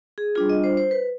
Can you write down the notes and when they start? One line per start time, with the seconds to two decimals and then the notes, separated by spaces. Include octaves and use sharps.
0.18 G#4
0.35 G3 D4 F4 G#4
0.50 D#5
0.64 C5
0.77 C5
0.91 B4